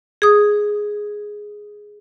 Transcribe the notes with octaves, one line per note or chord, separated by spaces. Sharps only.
G#4 D#6